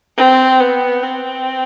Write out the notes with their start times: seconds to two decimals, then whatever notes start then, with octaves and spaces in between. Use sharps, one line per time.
0.17 C4
0.60 B3
1.03 C4